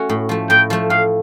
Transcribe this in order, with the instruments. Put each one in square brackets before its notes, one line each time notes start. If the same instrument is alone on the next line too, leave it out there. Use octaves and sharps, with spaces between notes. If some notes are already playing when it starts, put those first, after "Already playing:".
Already playing: [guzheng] A3 C#4 F#4
A2
F3 A3
[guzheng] A2 [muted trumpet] G5
[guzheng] F3 A3
[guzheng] A2 [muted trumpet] F5